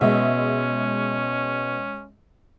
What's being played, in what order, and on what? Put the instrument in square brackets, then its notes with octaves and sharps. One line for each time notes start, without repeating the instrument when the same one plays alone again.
[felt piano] B2 [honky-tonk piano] G#3 D#5 E5 [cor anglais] C#4